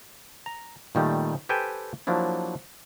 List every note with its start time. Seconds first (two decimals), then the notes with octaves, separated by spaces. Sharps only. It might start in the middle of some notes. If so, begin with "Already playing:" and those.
0.46 A#5
0.95 A#2 D#3 G3 A3
1.49 G4 A4 B4 C5 G5 G#5
2.07 F3 F#3 A#3 D4 E4